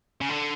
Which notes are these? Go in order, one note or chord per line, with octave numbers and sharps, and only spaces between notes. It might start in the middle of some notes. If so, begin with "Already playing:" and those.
C#3
D3